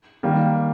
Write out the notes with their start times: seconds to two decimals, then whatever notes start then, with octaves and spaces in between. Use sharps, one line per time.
0.23 D#3 G3 A#3